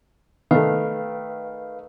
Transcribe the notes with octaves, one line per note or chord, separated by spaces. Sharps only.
D#3 A3 B4 F5